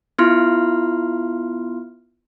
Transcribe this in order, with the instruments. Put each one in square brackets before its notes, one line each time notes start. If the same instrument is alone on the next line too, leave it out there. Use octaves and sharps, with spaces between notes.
[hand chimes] B3 E4 F4 C6 F6